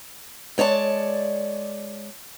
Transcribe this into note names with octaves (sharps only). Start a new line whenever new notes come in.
G#3 C#5 D5 A5